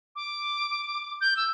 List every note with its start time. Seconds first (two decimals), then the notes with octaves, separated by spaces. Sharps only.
0.16 D6
1.21 G6
1.37 E6